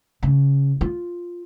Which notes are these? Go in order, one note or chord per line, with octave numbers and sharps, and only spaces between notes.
C#3
F4